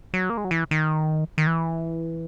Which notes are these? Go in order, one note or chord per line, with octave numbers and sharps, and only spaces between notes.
F#3
A#3
G#3
F#3
E3
D#3
D#3
E3